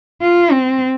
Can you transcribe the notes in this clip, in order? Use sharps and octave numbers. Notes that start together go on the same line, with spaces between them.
F4
C4